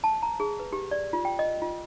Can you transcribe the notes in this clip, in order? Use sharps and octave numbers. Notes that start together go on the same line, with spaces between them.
A5
A#5
G#4
B4
G4
D5
F4
G5
D#5
F4